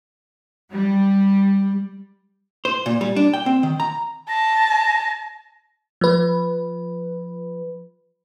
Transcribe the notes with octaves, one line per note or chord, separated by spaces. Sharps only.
G3
C5
A#2
G3
D4
G5
C4
D#3
A#5
A5 A#6
F3 B4